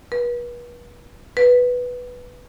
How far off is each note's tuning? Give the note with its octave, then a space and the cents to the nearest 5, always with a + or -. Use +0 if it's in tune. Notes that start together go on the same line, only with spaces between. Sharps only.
B4 -40
B4 +0